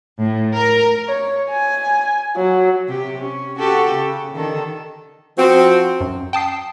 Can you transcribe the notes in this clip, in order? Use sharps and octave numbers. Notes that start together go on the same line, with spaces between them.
A2
A#4
C#5
G#5
F#3
C3 G4
C#4
F#4 G4 A4
C#3
D3 D#3 A4
F3 C4 F#4
F#2
G5 A5 D#6 C7